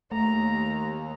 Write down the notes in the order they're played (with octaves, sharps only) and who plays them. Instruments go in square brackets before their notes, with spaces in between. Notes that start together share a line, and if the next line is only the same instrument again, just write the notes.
[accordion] D#2 [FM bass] A3 [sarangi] A#5